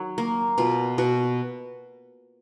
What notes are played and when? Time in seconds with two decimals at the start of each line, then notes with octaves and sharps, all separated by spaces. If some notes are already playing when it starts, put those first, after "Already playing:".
Already playing: D#3 F#3
0.18 A#3
0.58 B2 F4
0.98 B2 F#4